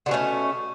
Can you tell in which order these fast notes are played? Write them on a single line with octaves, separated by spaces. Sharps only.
D3 B2 C#4 A3